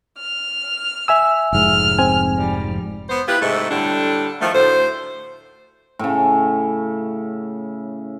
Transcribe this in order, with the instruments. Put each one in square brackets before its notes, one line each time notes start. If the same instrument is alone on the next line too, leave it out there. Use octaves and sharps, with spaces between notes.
[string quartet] F6
[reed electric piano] E5 G#5 E6
[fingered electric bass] F1 G#2 [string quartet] F6
[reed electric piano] C4 G#5
[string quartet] F3 G3
[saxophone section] B3 C5
E4 F4 G4 B4
G#2 C3 G#3 A3
A2 D3 G3 D4
D#3 F3 A3
D2 A2 C5
[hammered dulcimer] A2 C#3